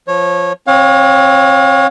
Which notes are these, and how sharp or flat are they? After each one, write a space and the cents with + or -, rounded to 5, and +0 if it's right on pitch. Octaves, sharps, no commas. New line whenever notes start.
F3 +0 C#5 -20
C4 +35 C#5 +0 F5 +40